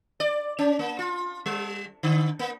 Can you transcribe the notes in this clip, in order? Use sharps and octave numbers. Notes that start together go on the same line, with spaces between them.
D5
C#4
A#3
F4
G3
D3
A#3